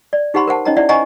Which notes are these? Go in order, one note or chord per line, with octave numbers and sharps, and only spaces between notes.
D5
D#4 G4 C5 F#5 B5 C6
A#4 C5 F#5 A5
C#4 D#4 C#5 D#5 F#5 A#5
E4 D5 E5 F#5
C5 D#5 F#5 G#5 A#5 C#6